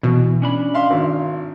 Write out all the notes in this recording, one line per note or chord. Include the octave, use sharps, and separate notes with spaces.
B2 E3
C#4 D4 B5
E5 F5 C6
G#1